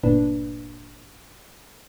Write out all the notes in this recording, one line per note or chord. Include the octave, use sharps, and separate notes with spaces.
G1 A#2 D4 B4